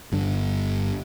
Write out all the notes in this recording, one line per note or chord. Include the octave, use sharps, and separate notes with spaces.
G1 G2 D3